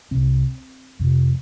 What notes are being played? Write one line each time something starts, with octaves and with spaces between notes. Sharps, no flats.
C2 C3 C4
F2 C3